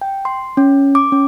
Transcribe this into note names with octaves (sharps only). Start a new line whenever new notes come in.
G5
C6
C#4
D6
C#4